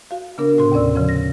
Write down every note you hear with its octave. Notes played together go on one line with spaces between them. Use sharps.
F#4 F5
C#3 B3 D4 A#4
A2 C3 F#4 C6
D#2 C3 C#4 D5 E6
C#3 F3 C#4
A#6